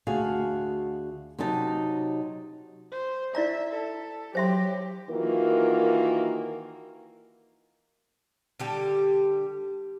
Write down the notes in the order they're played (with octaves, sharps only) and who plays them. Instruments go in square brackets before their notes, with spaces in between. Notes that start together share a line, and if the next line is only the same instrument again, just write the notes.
[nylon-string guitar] D2 F#4 G#4 F5 A5
C3 F#3 D#4 A5
[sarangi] C5
[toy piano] E4 D5 A#5 [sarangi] E5
[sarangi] A4
[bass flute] F#3 [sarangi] G4 [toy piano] C5 E5 C6
[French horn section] D#3 E3 A#3 F4 F#4 A#4
[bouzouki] D3 G3 G4